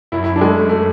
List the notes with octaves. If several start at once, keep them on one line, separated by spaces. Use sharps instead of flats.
F#2 E4
E4
D4
G#3
A3
A3
A3